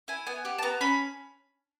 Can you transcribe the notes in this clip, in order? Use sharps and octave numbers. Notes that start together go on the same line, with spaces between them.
E4 G#5
B3 G#5
G4 F#5
A5
B3 A#5
C#4 B5